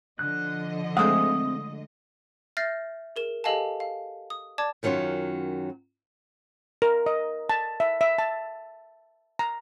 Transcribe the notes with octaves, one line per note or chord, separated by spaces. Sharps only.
D3 F3 D#5 F#6
G#3 A3 C4 C5 F5 F#5 D#6
E5 F6 G6 A6 A#6 C7
G#4 A#4 E7
G4 A4 D#5 F5 G#5 A5
F5
D#6
D5 A5 D6 G#6
F#2 D#3 F#3 C#4 F4
A#4
D#5
A5
E5
E5
A5
A#5